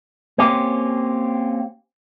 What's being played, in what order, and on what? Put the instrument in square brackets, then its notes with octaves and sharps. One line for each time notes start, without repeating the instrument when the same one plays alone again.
[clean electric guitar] A#3 C4 C#4 G4